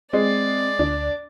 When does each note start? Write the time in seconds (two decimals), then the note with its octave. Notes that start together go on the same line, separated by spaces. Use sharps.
0.13 G#3 C4 D5
0.79 D2 D4